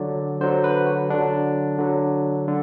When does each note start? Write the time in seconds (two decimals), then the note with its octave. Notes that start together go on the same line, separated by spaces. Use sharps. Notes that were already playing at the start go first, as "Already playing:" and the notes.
Already playing: D3 F#3 D5
0.40 D3 F#3 C5
0.64 B4
0.86 F#4
1.10 D3 F#3 D4
1.78 D3 F#3
2.48 D3